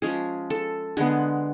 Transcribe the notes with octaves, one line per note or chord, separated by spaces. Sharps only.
F3 G#3 C#4 G#4
A4
D3 G#3 B3 G#4